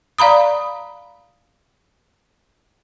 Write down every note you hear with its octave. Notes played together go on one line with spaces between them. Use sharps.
D5 F5 A#5 B5 D#6